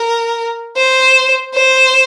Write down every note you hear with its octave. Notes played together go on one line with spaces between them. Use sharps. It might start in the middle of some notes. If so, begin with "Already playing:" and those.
Already playing: A#4
C5
C5